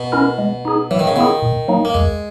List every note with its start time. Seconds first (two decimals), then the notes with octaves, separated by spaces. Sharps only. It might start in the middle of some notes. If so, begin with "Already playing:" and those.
Already playing: B2
0.12 C#4 E4 A#4
0.38 G#3
0.65 D#4 G#4
0.91 E3 F#3
0.99 D#3
1.07 C#3
1.16 D#3 B3 E4 G#4
1.42 A#2
1.68 F#3 A#3 D#4
1.85 A#3
1.94 E2 G#3